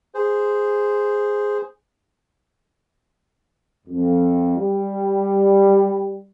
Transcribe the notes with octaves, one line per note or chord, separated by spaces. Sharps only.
G#4 C5
F2
G3